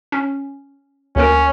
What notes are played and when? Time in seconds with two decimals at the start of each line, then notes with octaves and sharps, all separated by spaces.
0.12 C#4
1.16 D2 A#3 C#4 A#4